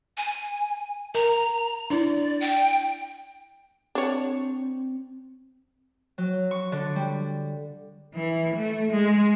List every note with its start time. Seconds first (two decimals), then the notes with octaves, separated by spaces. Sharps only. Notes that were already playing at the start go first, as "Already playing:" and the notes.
0.17 G#5
1.15 A#4 A#5
1.90 D4 E4 D5
2.41 G5
3.95 C4 D4 C#5
6.18 F#3
6.51 C#6
6.72 D3
6.95 G3
8.14 E3
8.55 A3
8.91 G#3